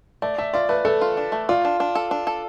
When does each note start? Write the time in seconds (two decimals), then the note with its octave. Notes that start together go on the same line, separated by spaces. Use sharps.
0.22 A3 D5
0.38 A3 E5
0.54 F4 D5
0.69 A3 B4
0.85 A3 A4
1.01 F4
1.17 D4
1.32 A3
1.49 F4 D5
1.65 D4
1.80 D4
1.95 A4
2.11 D4
2.27 A4